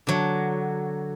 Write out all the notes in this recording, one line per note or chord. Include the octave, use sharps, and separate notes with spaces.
D3 F#3